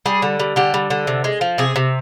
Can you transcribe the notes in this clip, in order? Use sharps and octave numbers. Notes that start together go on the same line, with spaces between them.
G3 G#4
D3
G3
D3 G4
G3
D3
C3
G#3
F3
C3 G#4
C3